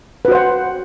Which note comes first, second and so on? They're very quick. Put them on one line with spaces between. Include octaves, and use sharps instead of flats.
B4 F#4 C5 F#5